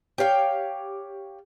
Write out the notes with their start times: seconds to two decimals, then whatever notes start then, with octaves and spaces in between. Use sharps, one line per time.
0.18 G4 C#5 F5 G5